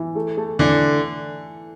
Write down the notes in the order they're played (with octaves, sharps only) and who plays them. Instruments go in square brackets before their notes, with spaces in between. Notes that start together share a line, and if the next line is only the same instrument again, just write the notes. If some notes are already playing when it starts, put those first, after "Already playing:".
Already playing: [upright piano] E3
A3
A3
[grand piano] D3 [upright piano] E3